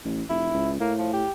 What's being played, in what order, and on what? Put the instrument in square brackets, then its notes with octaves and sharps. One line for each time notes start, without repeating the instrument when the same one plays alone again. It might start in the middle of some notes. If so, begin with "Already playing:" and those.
[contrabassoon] A1
[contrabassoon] F1 [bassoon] E4
[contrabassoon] C#2
[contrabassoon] A2 [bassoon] A#3
[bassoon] F3
G4